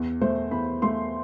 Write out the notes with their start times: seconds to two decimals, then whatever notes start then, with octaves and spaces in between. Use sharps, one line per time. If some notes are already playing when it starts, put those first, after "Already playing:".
Already playing: E2
0.21 A3 C5
0.51 E2 B5
0.82 A3 C6